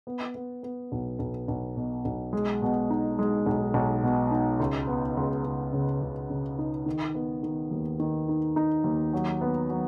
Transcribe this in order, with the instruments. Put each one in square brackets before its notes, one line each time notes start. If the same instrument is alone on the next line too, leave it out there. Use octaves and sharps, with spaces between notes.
[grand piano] B3
B3
B3
B1
B1
B1
B2
B1
G#3
B2
D#4
G#3
B1
B1
B2
D#4
C#2
B3
C#2
C#2
C#3
C#2
C#3
D#4
D#3
B3
D#3
D#2
D#3
D#4
D#4
D#2
F#3
B3
F#3